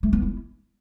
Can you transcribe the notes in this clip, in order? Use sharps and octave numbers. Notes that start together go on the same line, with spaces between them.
A3
B3
E4